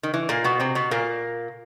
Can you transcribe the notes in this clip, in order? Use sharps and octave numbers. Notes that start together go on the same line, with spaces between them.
D#3
E3
A#2 A#3
B2 B3
C3 C4
B2 B3
A#2 A#3